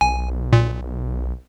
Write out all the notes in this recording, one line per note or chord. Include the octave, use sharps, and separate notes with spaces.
B1 G#5
A#2